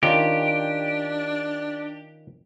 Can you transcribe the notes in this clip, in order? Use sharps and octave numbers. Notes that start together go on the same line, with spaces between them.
D#3 C#4 D4 F4 G4